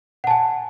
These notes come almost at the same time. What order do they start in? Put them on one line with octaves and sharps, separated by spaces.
F#5 A5 G#5